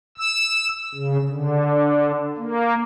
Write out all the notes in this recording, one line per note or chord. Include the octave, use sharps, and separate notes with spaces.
E6
C#3
D3
A#3